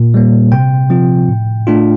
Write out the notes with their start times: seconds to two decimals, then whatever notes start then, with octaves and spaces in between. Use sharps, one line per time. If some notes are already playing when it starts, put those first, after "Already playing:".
Already playing: A#2
0.14 G3 A#3
0.52 C3 G5
0.90 F3 C4 F4
1.28 A2
1.67 A3 D4 F4